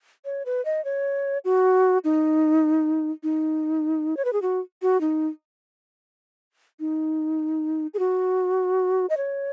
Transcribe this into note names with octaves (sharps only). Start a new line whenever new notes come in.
C#5
B4
D#5
C#5
F#4
D#4
D#4
C#5
B4
G#4
F#4
F#4
D#4
D#4
G#4
F#4
D#5
C#5